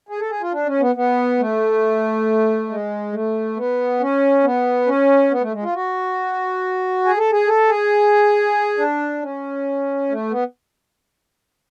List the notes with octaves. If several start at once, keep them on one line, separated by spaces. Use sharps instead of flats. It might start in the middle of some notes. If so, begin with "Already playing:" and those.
G#4
A4
G#4
F4
D4
C#4
B3
B3
A3
G#3
A3
B3
C#4
B3
C#4
B3
A3
G#3
F4
F#4
G#4
A4
G#4
A4
G#4
D4
C#4
A3
B3